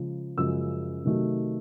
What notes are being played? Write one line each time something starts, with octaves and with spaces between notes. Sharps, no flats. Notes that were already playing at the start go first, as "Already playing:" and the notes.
Already playing: C#3 F3 G#3
F#2 C#3 F3 G#3 E6
C3 D#3 F#3 A3